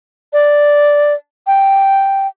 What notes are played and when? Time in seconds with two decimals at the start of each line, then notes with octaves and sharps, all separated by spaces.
0.33 D5
1.47 G5